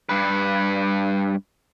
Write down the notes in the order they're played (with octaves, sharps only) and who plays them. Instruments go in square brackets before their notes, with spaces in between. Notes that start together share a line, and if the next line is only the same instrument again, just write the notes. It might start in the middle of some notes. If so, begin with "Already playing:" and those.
[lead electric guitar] G2 B4